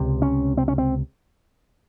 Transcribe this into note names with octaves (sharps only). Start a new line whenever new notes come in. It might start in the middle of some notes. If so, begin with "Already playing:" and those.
Already playing: C#2 C3
C#4
C4
C#4
C4